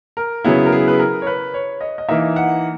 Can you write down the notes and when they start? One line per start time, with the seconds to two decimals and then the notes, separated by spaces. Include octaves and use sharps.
0.17 A#4
0.44 C#3 F#3 B3 E4 G#4
0.66 A#4
0.72 G#4
0.88 B4
0.99 A#4
1.22 C#5
1.27 B4
1.54 C#5
1.81 D#5
1.98 D#5
2.09 E3 A#3 D#4 E5
2.36 F#5